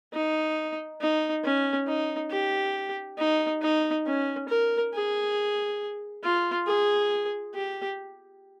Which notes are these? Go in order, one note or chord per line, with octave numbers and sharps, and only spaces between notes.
D#4
D#4
C#4
D#4
G4
D#4
D#4
C#4
A#4
G#4
F4
G#4
G4